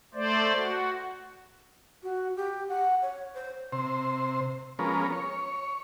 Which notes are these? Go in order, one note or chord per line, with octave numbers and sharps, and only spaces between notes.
A3 C5 D5
F#4
F#4
G4
F#5
C#5
C5
C3 C5
F3 G#3 B3 C#4 A#4
C#5